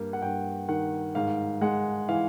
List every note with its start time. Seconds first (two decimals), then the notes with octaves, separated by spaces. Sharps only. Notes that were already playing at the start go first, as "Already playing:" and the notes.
Already playing: G2 A#3
0.13 F#5
0.22 G2 G5
0.68 D#3 F#5
1.15 G#2 F5
1.61 G#3 F#5
2.09 E3 F5